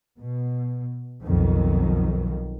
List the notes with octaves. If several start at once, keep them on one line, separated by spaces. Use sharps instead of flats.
B2
B1 F2 D#3